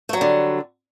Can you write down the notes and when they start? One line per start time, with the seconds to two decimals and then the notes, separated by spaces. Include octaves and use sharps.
0.09 A3
0.13 F#3
0.17 G3
0.21 D3